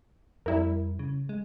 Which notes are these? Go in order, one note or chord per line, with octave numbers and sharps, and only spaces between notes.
F2 G3 E4 A#4
C#3
G#3